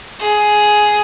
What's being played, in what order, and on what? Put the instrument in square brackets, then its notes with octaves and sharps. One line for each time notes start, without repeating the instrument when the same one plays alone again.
[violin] G#4